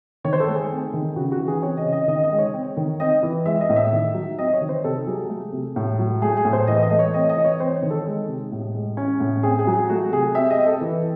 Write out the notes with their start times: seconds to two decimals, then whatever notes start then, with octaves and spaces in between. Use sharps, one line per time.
0.24 D#3 C#5
0.33 C5
0.40 A4
0.48 A3
0.55 G#4
0.71 C4
0.93 D#3
1.16 C#3 F#4
1.32 F#4
1.39 E3
1.48 G#4
1.62 C4 C#5
1.77 D#5
1.85 C#3
1.92 D#5
2.08 D#3 D#5
2.24 D#5
2.31 G#3
2.38 C#5
2.54 C4
2.77 D#3
3.00 C4 D#5
3.23 E3
3.45 G#3 E5
3.61 D#5
3.69 A2
3.76 E5
3.93 D#3
4.14 F#3
4.38 C4 D#5
4.53 C#5
4.61 D#3
4.69 C5
4.84 C3 A4
5.07 F#3 G#4
5.29 A3
5.52 C3
5.76 A2
5.99 F#3
6.22 A3 G#4
6.37 G#4
6.45 A2
6.53 C5
6.67 E3 D#5
6.82 D#5
6.91 A3
6.99 C#5
7.14 C4 D#5
7.29 D#5
7.36 E3
7.45 C#5
7.60 C4 C5
7.74 C#5
7.82 D#3
7.90 A4
8.06 G#3
8.28 C3
8.52 A2
8.74 G#3
8.97 C#4
9.20 A2
9.43 C4 G#4
9.59 G#4
9.67 F#3
9.73 G#4
9.89 A3 F#4
10.12 C3 G#4
10.35 C4 E5
10.50 D#5
10.58 C4
10.66 A4
10.81 E3